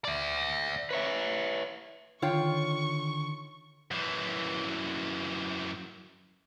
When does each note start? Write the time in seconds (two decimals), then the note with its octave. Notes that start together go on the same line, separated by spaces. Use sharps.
0.05 D5 E5
0.91 B4 C#5 E5
2.22 D3 D#3 F4 C#5 G5 C#6
3.91 F#2 E3